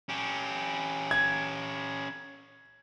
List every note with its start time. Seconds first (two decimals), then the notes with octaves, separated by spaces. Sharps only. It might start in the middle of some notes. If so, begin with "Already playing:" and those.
0.09 C#4 G4
1.11 G#6